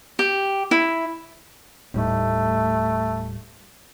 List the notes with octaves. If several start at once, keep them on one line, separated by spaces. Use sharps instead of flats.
G4
E4
D#1 A2 G3 A3 D#4